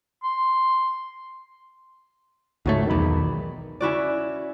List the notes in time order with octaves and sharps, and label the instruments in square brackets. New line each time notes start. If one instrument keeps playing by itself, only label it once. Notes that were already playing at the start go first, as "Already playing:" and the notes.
[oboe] C6
[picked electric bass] C#2 G#2 A3 [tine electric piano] D#4 F#4 C#5
[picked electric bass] B1 E2 [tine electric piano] D#3 D#4 B5
[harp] C#4 E4 F#4 D5